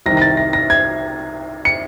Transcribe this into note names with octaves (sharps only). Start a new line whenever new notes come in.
C2 C3 D#3 A#6
A#6
A6
A#6
A#6
G#6
C#7